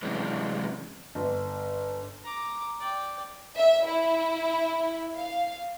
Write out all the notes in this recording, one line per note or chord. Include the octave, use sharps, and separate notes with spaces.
F#2 C3 E3 G#3 C#4 D4
G1
A#5 D6
D5 G5
E5
E4
F5